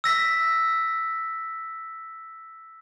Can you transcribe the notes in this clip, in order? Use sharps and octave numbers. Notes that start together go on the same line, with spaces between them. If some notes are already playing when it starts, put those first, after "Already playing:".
E6 A#6 B6